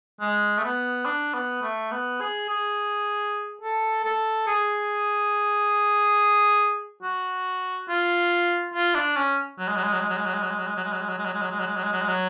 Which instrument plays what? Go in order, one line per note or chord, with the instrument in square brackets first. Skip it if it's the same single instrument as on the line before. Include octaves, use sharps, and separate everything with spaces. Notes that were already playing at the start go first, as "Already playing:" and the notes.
[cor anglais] G#3
A3
B3
D4
B3
A3
B3
G#4
G#4
A4
A4
G#4
F#4
F4
F4
D4
C#4
F#3
G#3
F#3
G#3
F#3
G#3
F#3
G#3
F#3
G#3
F#3
G#3
F#3
G#3
F#3
G#3
F#3
G#3
F#3
G#3
F#3
G#3
F#3
G#3
F#3
G#3
F#3
G#3
F#3
G#3
F#3